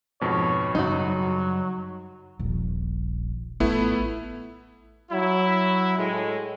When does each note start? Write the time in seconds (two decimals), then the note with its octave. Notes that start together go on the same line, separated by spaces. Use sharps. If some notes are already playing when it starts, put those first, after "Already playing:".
0.21 F2 G#2 B2 C#5
0.75 F#2 C#3 F#3 G3 D#4 F#4
2.39 D#1 A#1
3.60 A1 A3 B3 E4 F4
5.11 F#3 E4
5.97 A2 G#3